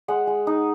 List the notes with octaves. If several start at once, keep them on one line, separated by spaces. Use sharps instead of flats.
G#3 F#5
G#3
D#4